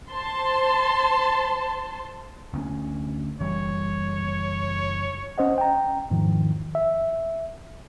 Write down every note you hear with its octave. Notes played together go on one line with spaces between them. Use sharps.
C5 A5 C6
D2 C4 C#4
F#1 E3 G3 C#5
C#4 C5 D#5 F#5
G5 A#5
E2 G#2 D#3 F3
E5